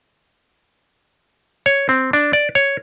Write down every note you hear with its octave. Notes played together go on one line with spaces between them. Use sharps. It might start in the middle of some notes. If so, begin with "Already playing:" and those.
C#5
C4
D4
D5
C#5